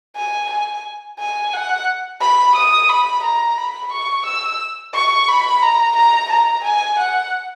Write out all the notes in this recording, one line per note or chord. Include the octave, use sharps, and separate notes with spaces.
G#5
G#5
G#5
F#5
B5
D#6
B5
A#5
B5
C#6
E6
C#6
B5
A#5
A#5
A#5
G#5
F#5